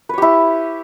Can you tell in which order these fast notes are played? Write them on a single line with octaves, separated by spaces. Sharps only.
B4 C#5 G4 E4